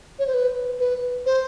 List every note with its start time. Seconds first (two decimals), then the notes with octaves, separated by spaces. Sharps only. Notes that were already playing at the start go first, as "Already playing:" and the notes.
0.19 C#5
0.27 C5
0.34 B4
0.80 B4
1.26 C5